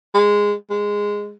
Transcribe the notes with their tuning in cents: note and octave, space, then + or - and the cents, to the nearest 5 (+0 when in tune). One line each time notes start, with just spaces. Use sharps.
G#3 -10
G#3 -10